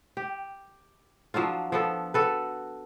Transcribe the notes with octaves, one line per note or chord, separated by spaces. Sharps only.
G4
F3 F#3 D4 F4
F3 B3 A4
F#4 A4 B4